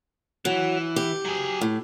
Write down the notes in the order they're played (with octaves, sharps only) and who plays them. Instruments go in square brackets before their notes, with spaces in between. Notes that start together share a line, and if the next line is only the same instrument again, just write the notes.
[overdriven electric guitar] E3 [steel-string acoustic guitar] F#3
[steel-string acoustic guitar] G4
[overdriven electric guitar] F#3 G#4
[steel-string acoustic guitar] A2